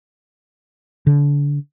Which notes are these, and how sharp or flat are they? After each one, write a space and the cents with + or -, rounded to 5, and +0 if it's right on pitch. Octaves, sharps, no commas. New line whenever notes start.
D3 -30